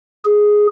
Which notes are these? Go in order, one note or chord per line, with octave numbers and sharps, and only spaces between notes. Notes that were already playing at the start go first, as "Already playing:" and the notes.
G#4